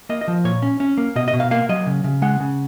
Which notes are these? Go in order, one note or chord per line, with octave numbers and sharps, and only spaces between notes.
A#3 D#5
D#5
F3
A#2 C#5
C#4
C#4
A#3
B2 D#5
D#5
B2
F5
A#3 F5
F#3 D#5
C#3
C#3
G#3 F#5
C#3